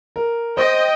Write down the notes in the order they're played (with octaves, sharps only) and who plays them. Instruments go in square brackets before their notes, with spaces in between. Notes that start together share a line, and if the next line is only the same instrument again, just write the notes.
[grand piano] A#4
[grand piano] C5 [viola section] D#5 G5